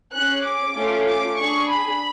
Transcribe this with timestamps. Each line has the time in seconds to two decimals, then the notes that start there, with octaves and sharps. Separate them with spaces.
0.12 C#4 G#4 F#6
0.43 D6
0.75 A3 C#4 F4
1.06 D6
1.37 D4 G#4 C#6
1.68 B5